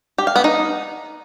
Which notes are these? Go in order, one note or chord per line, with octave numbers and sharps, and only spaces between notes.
G4
F5
B3
D#4